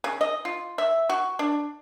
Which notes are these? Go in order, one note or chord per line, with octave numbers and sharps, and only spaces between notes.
C#3
D#5
F4
E5
F#4
D4